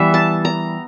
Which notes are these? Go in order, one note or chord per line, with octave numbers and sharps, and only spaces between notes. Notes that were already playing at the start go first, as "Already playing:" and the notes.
Already playing: E3 G3 B3 E5
A5
A#5